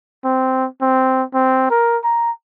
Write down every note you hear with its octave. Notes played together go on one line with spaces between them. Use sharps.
C4
C4
C4
A#4
A#5